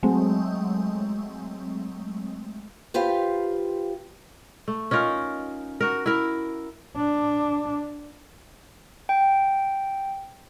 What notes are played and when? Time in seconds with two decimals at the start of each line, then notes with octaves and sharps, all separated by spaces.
0.03 F#3 G#3 A3 C4
2.94 F4 G4 B4 C5 F5
4.68 A3
4.91 C#4 D#4 F4 A#4
5.81 F#4 A#4
6.06 E4 A#4
6.96 D4
9.09 G5